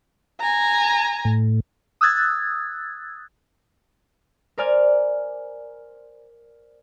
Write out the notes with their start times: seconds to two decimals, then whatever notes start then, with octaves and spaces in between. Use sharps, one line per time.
0.40 G#5 A#5
1.25 A2
2.01 D#6 E6 F#6 G#6 A6
4.58 A#4 C5 D5 G#5 F6 G#6